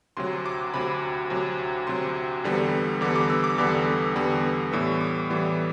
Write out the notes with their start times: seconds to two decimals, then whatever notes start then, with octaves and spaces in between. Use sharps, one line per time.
0.17 D2 C3 F#3 C6
0.46 D6
0.74 D2 C3 F#3 B5
1.30 D2 C3 F#3
1.87 D2 C3 F#3 C6
2.44 E2 D3 G3 B3
3.01 E2 D3 G3 B3 D6
3.16 D6
3.30 E6
3.44 D6
3.58 E2 D3 G3 B3 D6
4.16 E2 D3 G3 B3
4.72 A2 E3 G3 B3 E6
5.01 D6
5.29 A2 E3 G3 B3